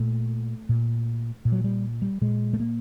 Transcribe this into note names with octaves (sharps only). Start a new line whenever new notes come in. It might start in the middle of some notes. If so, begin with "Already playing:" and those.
Already playing: A#2 A3
A#2
A#2
F#3
G3
G3
A#2 G#3
A3
A#3